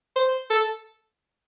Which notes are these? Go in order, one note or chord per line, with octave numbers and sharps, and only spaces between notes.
C5
A4